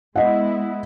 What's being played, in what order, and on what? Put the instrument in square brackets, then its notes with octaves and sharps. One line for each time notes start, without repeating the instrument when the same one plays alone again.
[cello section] G#3 B3 E4 [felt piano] D#5 F#5